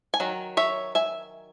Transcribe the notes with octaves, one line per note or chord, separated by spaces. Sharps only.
G#5
D#3 F#3
C#5 E5
E5 G#5